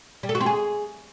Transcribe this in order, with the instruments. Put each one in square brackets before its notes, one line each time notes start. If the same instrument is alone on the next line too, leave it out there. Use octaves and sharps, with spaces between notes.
[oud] G3
A4
F#4
C4
G#4